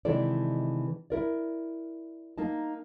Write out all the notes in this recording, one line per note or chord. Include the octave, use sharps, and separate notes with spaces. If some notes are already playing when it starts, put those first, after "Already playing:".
C3 D#3 E3 G#3 A4 D5
E4 A#4 D5
A#3 D#4 A5